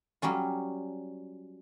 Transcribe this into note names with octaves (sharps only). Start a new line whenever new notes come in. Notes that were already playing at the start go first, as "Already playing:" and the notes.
F#3 G3 C#4 F4